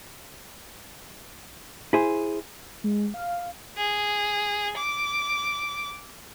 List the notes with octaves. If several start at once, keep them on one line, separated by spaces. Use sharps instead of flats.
E4 G#4 C5
G#3
F5
G#4
D6